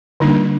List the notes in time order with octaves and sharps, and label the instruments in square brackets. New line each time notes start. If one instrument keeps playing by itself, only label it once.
[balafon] D3 G3 A#3 D4 D#4